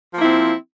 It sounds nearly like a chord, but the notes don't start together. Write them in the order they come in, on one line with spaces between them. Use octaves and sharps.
F3 A#3 E4 C4